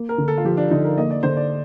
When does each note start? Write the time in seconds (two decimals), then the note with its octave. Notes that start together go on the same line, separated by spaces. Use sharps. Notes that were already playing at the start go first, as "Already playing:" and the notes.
Already playing: A#3
0.09 A#4
0.18 D3
0.28 A4
0.38 F4
0.45 F3 G4
0.57 D4
0.71 D3 D#4
0.84 A#4
0.97 A#3 D#5
1.10 D5
1.23 D3 C5
1.37 D5